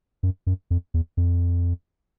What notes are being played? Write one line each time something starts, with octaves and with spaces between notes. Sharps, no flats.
F#2
F#2
F2
E2
F2